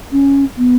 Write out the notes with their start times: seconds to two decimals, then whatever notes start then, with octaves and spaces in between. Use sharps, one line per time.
0.12 C#4
0.57 B3